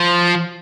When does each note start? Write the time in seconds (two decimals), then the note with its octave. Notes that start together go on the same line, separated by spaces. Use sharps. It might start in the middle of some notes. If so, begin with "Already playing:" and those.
Already playing: F3